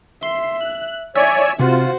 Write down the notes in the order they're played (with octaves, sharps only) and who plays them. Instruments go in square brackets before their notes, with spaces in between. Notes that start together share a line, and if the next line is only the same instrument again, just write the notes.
[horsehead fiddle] E5 [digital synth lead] C6
[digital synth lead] F#6
[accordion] C#5 D5 [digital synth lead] E5 [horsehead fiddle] G#5
[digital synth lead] C3 [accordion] F4 [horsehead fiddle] F#4 C5